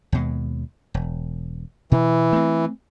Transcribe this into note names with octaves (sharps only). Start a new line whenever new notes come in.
D#2 B2 G#3
E1
B2 E3
A3 C4